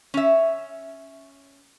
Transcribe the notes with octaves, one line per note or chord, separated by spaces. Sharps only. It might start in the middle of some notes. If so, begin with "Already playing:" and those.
C#4 E5